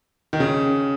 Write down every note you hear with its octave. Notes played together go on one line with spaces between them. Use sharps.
D#3
C#3